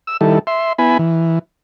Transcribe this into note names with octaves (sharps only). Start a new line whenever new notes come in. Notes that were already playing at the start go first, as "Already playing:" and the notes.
E6
D#3 G3 E4 A4
E5 C6
B3 E4 G#5 B5
E3